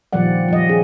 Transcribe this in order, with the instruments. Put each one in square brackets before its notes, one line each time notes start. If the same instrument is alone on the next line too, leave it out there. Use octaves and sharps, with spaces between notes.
[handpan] A#2 D#3 F3 G3 D5 F#5
F3 G3 D#5
C#4 G#4